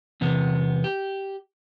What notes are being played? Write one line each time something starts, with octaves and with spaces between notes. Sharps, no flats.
E2 C3 B3
G4